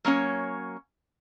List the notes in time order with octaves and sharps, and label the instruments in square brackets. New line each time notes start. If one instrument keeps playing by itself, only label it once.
[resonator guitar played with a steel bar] F#3 A#3 C#4 C#5